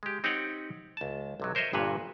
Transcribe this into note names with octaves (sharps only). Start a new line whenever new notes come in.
G#3 G4
C4 D#4 G4 C#5 F#5 G5
C#2 A5
B1 C3 F#3
A#4 C5 C#5 D#5 E5
G1 G2 A#2 B4 C#5